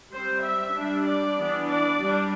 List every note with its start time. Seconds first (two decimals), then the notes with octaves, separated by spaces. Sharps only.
0.12 G3 C4 C5
0.44 E5
0.75 G3 D4
1.06 D5
1.37 E3 B3 D4
1.68 D5
1.99 G3 D4